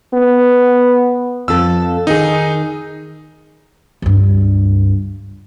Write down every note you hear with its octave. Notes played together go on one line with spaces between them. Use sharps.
B3
F2 A4 E6
D#3 D#4 G#4
C#2 G2